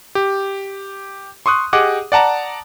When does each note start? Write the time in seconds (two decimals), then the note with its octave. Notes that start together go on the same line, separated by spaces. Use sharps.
0.15 G4
1.46 C6 C#6 D#6 F#6
1.73 G4 G#4 D#5 F#5 D6 F#6
2.12 D5 F#5 A5 A#5